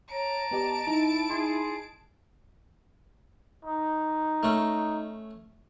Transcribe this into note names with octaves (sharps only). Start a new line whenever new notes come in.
C#5 A5 A#5 D7
B3 G4 D5 D#5
D#4 E4
D#4 G#4 C6
D#4
A3 C#4